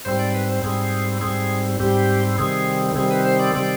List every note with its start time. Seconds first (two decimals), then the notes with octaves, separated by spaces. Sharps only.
0.05 G#2 G3 C4 C5
0.19 D5
0.34 B4
0.49 C5
0.63 G#2 G3 C4 G#4
1.21 G#2 G3 C4 G#4
1.80 G#2 G3 C4 G4
2.38 C3 D#3 G3 C4 G#4
2.95 C3 D#3 G3 C4 G#4
3.11 B4
3.25 C5
3.39 D5
3.55 C3 D#3 G3 C4